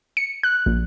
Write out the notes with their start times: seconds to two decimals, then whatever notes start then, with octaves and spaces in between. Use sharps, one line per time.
0.17 C#7
0.43 F#6
0.66 A#1